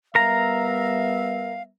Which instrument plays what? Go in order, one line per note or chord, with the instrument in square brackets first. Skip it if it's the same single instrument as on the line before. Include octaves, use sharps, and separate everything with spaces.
[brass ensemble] G3 B3 E5 [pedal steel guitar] A#4 A#5 [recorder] F5